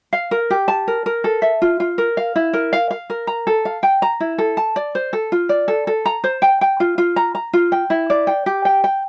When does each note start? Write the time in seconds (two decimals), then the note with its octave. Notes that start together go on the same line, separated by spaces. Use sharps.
0.13 F5
0.31 A#4
0.50 G4
0.68 A5
0.88 A#4
1.06 A#4
1.24 A4
1.42 E5
1.62 F4
1.80 F4
1.98 A#4
2.17 F5
2.36 E4
2.53 A#4
2.73 F5
2.91 F5
3.10 A#4
3.27 A#5
3.47 A4
3.65 F5
3.83 G5
4.02 A#5
4.20 E4
4.38 A4
4.57 A5
4.76 D5
4.95 C5
5.13 A4
5.32 F4
5.49 D5
5.68 A4
5.87 A4
6.06 A#5
6.24 C5
6.42 G5
6.61 G5
6.80 F4
6.98 F4
7.16 A#5
7.35 A#5
7.53 F4
7.72 G5
7.90 E4
8.10 D5
8.27 G5
8.46 G4
8.65 G5
8.84 G5